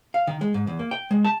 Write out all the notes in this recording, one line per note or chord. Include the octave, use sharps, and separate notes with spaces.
F5
D#3
G#3
G#2
E2
A#3
G5
G#3
A5